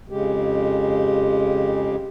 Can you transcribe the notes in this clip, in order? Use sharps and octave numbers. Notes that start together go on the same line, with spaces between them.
F2 C#3 G#3 G4